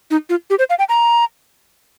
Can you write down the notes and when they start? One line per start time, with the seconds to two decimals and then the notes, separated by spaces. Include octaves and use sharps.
0.11 D#4
0.29 F4
0.50 G4
0.59 C5
0.70 F5
0.79 G5
0.89 A#5